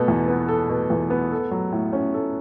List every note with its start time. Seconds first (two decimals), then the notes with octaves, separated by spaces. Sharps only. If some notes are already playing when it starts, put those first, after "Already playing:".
Already playing: B2 B3 A4
0.08 E2
0.28 B3
0.48 A4
0.69 B2
0.90 E2
1.10 B3
1.32 A4
1.51 F#3
1.72 A2
1.93 C#4
2.14 A4